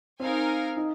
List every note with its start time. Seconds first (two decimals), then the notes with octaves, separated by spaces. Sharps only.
0.20 C4 D#4 A#4 F5 G#5
0.77 D#4